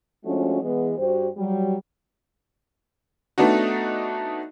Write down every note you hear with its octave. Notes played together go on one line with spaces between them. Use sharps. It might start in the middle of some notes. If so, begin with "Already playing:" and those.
F3 G#3 A3 C#4 D4 F#4
E3 G#3 B3
G2 F#4 G4 C5
F#3 G3
A3 B3 D4 D#4 F#4